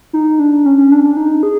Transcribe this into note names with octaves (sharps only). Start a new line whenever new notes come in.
D#4
D4
C#4
C#4
D4
D4
D#4
G#4